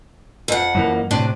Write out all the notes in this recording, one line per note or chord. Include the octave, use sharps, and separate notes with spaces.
F2 F#5
F#2 E3 A#3
A2 C3 D4